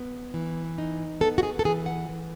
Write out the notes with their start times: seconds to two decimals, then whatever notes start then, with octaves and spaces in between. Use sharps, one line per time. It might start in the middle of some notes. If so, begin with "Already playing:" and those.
Already playing: B3
0.34 E3
0.78 D#4
1.21 B3 A4
1.38 F#4
1.43 G#4
1.59 A4
1.65 E3 G#4
1.86 F#5
2.09 E3